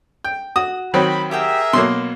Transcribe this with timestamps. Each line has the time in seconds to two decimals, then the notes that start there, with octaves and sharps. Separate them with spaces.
0.24 G5
0.56 F#4 D#6
0.94 D#3 F#3 C4 B5
1.31 G4 G#4 A#4 E5 F#5 G5
1.73 B2 F#3 A#3 C6